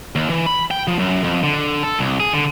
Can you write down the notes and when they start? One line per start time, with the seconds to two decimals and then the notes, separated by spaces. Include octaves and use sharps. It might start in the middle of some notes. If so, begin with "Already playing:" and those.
0.15 D#2
0.30 E3
0.46 B5
0.71 G5
0.87 F3
0.99 F#2
1.24 F2
1.43 D3
1.83 A4
1.99 C2
2.20 G#4
2.33 D3